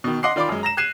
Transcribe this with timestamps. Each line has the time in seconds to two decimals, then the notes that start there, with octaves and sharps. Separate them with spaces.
0.04 B2 D#3
0.23 D#5 F#5 C6 D6 C7
0.36 D#3 F4 D5 B5 C6 D6
0.49 F#2 G#3
0.63 A#5 A#6 E7
0.77 F#6 G#6 C7 D#7 E7